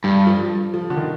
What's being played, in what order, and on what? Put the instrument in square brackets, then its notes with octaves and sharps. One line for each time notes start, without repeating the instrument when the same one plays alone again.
[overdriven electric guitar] G2 [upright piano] G3
[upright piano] F3
F3
D3
D#3